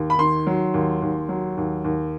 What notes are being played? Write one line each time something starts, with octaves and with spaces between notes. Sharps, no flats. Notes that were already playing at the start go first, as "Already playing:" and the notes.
Already playing: D#2
B5
D#3 C6
F#3
D#2
D#2
F#3
D#2
D#2